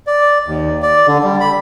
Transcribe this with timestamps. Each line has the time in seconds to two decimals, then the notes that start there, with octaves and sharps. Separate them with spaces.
0.07 D5
0.46 D#2
0.82 D5
1.07 D3
1.24 G3
1.40 B5